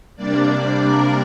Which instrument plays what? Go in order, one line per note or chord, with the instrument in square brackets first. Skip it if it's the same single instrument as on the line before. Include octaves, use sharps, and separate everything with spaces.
[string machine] C3 G3 A#3 D4 D5
A#3 A#4